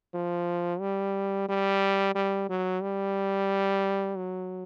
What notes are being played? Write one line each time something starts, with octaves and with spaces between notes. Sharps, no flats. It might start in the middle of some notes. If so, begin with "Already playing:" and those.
F3
G3
G3
G3
F#3
G3
F#3